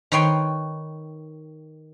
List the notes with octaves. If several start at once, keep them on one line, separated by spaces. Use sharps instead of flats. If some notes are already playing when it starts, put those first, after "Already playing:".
D#3 B4 C#5 G5 C6